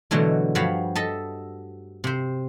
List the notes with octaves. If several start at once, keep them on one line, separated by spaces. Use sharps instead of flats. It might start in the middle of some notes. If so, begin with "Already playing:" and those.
B2 D3 E3 F#3 G#3 A3
G2 F3 F#4 C#5 F5 B5
A4 D#5 E5 A5
C3 C5